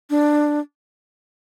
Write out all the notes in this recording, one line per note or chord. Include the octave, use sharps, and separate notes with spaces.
D4